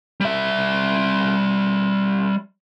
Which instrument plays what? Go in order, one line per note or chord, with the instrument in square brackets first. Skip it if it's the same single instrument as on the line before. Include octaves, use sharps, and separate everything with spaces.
[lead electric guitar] G3 E5